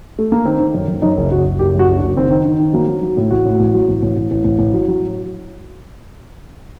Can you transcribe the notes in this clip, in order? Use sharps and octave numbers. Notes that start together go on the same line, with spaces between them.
A3
A#3
D#3 C4
D#3
F#2
F#2
F#2 D#4
F#1
F#1 F#4
F#1
F#1 G4
F#2
F#4
F#1
D4
F#1
D#3 C4
D#3
D#3
D#3
F#3 A#3
F#3
F#3
A2
A1 F#4
A2
A1
F#3
A1
A1
A1
A1
A1
A1
F#3
F#3